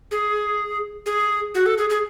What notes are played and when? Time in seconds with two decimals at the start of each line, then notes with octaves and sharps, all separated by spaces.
0.11 G#4
1.06 G#4
1.55 F#4
1.66 A4
1.78 G#4
1.90 G#4